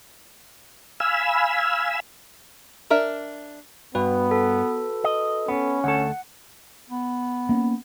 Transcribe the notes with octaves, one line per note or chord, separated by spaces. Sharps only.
F5 G#5 B5 E6
D4 A#4 E5
G2 B3 F#4 B4
A4
D#5
B3 C#4
D2 A3 A4 F#5
B3
A#3 C#4